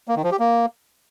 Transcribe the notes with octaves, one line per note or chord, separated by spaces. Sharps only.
A#3
D#3
F3
G4
A#3